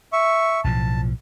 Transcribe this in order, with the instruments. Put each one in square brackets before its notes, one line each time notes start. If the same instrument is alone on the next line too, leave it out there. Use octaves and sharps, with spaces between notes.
[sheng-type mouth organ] E5 C#6
[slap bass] B1 A2 F3 [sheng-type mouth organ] A5